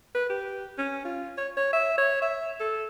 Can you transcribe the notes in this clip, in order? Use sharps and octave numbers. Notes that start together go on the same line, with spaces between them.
B4
G4
C#4
F4
C#5
C#5
E5
C#5
E5
A4